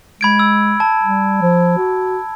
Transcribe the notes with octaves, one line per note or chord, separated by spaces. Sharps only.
G#3 B5 G#6 D7
E6
A5
G3
F3
F#4